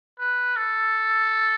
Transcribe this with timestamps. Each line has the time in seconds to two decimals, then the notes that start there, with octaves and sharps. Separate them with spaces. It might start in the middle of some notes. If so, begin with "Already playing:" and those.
0.19 B4
0.56 A4